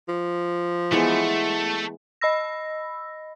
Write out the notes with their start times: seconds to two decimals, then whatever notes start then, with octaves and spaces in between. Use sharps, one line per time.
0.08 F3
0.92 E3 G#3 A3 B3
2.21 D#5 B5 E6 A#6